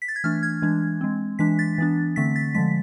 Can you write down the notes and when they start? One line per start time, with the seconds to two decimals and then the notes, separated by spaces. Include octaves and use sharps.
0.02 B6
0.08 A6
0.16 G#6
0.24 E3 A3 D4 F6
0.43 G#6
0.62 E3 G#3 D4
1.01 G#3 C4
1.39 E3 G#3 D4 B6
1.59 A6
1.78 E3 B3 D4
2.16 D3 A3 C4 B6
2.36 A6
2.54 D3 F3 G#3 B6